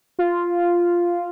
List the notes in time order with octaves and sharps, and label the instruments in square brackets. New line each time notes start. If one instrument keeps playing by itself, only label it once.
[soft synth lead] F4